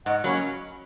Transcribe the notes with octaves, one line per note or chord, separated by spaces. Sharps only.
G#2 D#5 F#5
F#3 A#3 C#4 G#5 B5